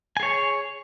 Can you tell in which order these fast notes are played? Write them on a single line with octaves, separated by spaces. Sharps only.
G#5 G#4 C#5